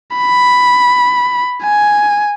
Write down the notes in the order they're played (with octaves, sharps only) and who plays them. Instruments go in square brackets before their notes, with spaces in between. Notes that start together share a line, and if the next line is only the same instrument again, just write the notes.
[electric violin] B5
G#5